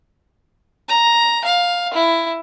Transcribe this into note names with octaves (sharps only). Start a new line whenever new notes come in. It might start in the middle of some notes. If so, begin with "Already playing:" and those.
A#5
F5
E4